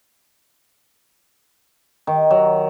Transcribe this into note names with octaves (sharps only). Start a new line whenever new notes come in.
D#3
F#3